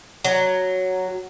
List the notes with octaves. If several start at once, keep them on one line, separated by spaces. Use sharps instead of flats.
F#3